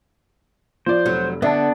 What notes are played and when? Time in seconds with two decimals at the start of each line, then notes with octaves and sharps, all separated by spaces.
0.86 F3 C5 D5
1.06 F1 F#3
1.42 D3 B3 D4 E5 A5